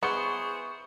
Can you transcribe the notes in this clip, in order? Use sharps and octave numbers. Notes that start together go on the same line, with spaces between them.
B3 E4 G#4 C5 C#6 C#7